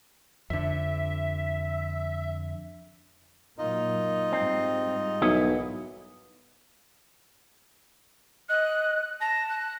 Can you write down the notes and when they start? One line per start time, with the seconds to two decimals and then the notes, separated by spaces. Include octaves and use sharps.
0.50 F2 D3 E5
3.58 A#2 F#3 A#3 D#4 F4 D#5
4.32 G#2 G3 C4
5.22 B1 E3 A#3 B3 E4 D#5
8.49 D#5 F#6
9.21 A5 A#6
9.49 F#6